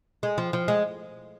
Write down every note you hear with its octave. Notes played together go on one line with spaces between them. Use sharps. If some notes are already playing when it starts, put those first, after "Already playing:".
G#3
F3
F3
G#3